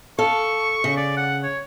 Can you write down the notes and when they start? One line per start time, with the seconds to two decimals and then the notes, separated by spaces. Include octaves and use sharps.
0.19 A4 F5 C#6
0.84 C#3
0.97 D5
1.17 F#5
1.44 C#5